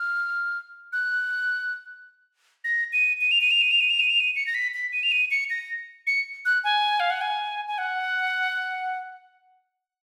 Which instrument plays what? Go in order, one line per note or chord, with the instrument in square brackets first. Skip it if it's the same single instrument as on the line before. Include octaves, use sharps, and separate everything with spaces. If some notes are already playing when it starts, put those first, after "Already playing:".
Already playing: [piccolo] F6
F#6
A#6
D#7
D#7
F7
D#7
F7
D#7
F7
D#7
F7
D#7
F7
D#7
C#7
A#6
B6
B6
D#7
F7
D#7
C#7
A#6
C#7
F#6
G#5
F5
F#5
G#5
G#5
F#5